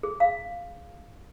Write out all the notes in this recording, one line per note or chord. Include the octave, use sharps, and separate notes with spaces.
G#4
F5